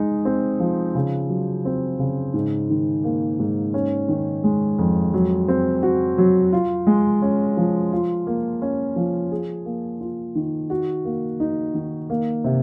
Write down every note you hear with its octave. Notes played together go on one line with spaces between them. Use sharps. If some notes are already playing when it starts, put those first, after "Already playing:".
Already playing: G#3 D#4
C4
F3
C#3
F#3
C4
C#3
G#2
D#3
A#3
G#2
C#4
D#3
G#3
F2
F#3
C4
F#4
F#3
F4
G#3
C#4
F3
F4
A#3
C#4
F3
G#4
A#3
F4
D#3
F#4
A#3
D#4
D#3
A#3
C3